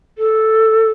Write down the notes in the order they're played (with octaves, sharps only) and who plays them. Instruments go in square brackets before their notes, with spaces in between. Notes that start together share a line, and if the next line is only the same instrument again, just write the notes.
[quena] A4